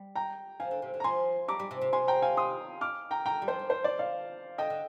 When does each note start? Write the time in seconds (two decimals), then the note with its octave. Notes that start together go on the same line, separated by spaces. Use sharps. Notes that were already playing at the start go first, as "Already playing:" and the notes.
Already playing: G3
0.15 G5 A#5
0.60 F3 F5 G#5
0.71 D3
0.82 C3
0.94 D3
1.00 A#5
1.04 F3 G#5 C6
1.48 G3 A#5 D6
1.60 G3
1.71 C3
1.81 C3
1.93 C3 G#5 C6
2.08 G5 A#5
2.22 F5 G#5
2.37 C6 D#6
2.81 D6 F6
3.11 G5 A#5
3.25 D3 G5 A#5
3.42 G3
3.48 F3 C5
3.59 F3
3.70 D#3 C5
3.84 D5
3.99 D5 F5
4.58 D3 D#5 G5
4.70 D3